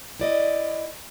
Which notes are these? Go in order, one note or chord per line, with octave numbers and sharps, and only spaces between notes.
E4 D5 D#5